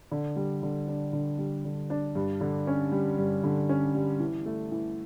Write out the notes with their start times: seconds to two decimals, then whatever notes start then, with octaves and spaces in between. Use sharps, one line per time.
0.12 D3
0.36 G3
0.63 D3
0.88 D4
1.13 D3
1.38 G3
1.65 D3
1.90 D4
2.15 G2
2.41 D3
2.67 C#4
2.92 G3
3.18 G2
3.44 D3
3.69 C#4
3.95 G3
4.20 E3
4.46 A3
4.72 E3